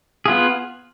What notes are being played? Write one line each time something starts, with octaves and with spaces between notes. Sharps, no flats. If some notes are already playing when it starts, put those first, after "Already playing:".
B3 F4 G#4